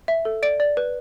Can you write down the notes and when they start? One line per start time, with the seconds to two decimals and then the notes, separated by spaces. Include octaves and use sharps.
0.08 E5
0.25 A4
0.43 D5 D7
0.60 D5
0.77 B4